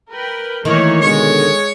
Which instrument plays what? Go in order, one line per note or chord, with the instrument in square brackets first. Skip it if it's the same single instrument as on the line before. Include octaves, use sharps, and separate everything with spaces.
[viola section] A#4 B4 G5
[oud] D#3 [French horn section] E3 [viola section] A3 A#3 C#5
[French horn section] B2 D3 [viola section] G#3 [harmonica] C#5